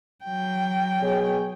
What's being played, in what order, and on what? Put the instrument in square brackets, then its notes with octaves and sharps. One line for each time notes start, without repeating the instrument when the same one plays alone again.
[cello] F#3 G5
[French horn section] B2 G#4 C#5